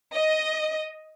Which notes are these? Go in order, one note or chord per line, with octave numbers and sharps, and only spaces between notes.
D#5